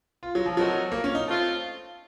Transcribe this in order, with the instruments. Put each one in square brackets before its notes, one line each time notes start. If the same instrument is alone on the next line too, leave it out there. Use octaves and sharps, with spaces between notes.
[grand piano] F4
F#3
F3
[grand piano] F#3 [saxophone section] A3 C4 F#4 A#4 D#5
[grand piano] A#3
C#4
D#4
[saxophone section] A3 C4 F4